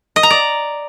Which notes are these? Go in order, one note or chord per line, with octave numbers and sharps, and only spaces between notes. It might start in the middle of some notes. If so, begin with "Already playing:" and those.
D#5
A#5
D5